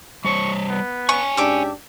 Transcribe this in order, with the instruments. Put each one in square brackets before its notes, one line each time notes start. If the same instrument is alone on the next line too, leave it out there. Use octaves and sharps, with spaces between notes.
[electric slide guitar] G3 C5 C#5 [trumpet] C#6
[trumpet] B3
[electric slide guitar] C#5 G5 G#5 [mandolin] C#6
[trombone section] G#2 C#4 D4 [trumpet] G4 [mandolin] E5 D6